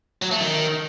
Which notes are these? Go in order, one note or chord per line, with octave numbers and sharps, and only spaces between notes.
F#3
A3
D#3